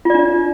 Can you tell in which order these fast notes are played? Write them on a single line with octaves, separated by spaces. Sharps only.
F4 D5 D4